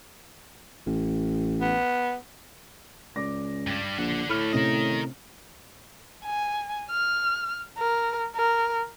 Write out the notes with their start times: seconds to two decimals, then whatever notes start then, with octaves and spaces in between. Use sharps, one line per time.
0.87 A1
1.61 B3
3.16 C#2 D5 D6 A#6
3.67 G2 G3
3.98 A#1 D4 F#5
4.29 A2 D3 A3 B5 F6
4.52 C3 C4 C#4 A#4 D#5
6.25 G#5
6.90 F6
7.78 A#4
8.36 A#4